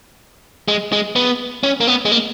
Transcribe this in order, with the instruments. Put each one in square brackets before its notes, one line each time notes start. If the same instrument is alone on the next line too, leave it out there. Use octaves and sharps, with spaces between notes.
[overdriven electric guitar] G#3
G#3
B3
C#4
A#3
B3
G#3
A#3